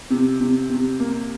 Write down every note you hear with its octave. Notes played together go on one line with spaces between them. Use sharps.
C3
C3
C3
A#3